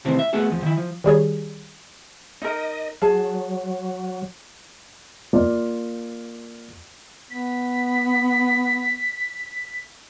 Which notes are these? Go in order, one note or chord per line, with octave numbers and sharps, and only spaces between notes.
C3 D#3 E3 A3 C4
E5
A3 B3 F#4 G#4 A4
E2 F3
D#3 E4
F3
D#3 G3 G#4 C#5
D#4 A#4 D#5
F#3 G#4 A5
A#3 F4 D5
B3 B6